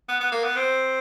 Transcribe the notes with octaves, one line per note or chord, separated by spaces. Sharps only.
B3
B3
A#3
B3
C4